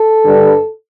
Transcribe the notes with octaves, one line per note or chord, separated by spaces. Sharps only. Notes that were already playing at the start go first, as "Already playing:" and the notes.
Already playing: A4
G2 D3 G3